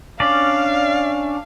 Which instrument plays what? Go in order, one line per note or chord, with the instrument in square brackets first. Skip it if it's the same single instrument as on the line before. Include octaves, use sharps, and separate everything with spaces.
[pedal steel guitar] C#4 D4 D5 [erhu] F5